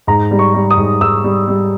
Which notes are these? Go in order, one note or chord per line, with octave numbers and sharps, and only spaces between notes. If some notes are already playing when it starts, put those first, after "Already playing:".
G#2 A#5
G3
C#6
G3
D#6
G#2
G#2 E6
G3
G3